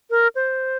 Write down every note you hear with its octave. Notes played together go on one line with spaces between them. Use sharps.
A#4
C5